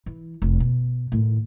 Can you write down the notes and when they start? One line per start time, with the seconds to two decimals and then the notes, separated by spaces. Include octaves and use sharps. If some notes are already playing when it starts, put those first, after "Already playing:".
0.06 E3
0.42 F1 E2
0.60 B2
1.12 A2 D#3